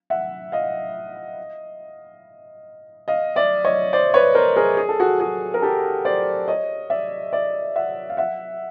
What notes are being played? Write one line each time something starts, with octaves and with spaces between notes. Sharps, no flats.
E5 F#5
D#5 F5
D#5 F5
D5 E5
C#5 D#5
C5 D5
B4 C#5
A#4 C5
G#4 A#4
G#4
A4
F#4 G#4
F#4 G#4
A#4
G4 A4
C5 D5
C#5 D#5
D5 E5
D5 E5
E5 F#5
F5
E5 F#5